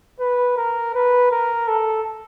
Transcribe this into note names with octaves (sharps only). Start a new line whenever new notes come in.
B4
A#4
B4
A#4
A4